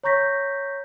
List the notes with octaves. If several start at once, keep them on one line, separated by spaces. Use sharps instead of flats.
C#5 A#5 C#6 G6 A#6 B6